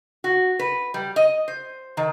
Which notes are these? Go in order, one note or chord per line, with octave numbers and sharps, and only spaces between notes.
F#4
B4
G3
D#5
C5
D#3